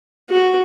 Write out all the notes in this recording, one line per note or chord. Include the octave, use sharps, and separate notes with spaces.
F#4